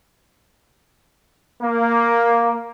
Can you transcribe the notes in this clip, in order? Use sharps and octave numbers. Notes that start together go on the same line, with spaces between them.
A#3